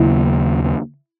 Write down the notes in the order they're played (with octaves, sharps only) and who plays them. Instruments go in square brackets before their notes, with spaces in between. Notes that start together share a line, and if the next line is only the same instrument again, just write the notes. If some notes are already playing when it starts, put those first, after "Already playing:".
Already playing: [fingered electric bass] D#2 C#3 F#3 A#3 [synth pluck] E4